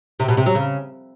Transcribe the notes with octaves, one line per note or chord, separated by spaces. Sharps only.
C3
B2
C3
F#3
C#3